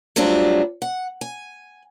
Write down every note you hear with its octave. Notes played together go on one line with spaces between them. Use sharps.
F#3 G3 A3 C4 D4 F4
F#5
G#5